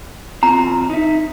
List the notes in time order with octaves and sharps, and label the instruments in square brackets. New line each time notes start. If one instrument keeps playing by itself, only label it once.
[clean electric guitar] D#3 C4 F4 [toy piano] A#5
[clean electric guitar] D#4 E5